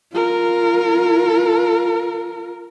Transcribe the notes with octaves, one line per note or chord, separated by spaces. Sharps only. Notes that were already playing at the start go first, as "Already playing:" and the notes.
F4 A#4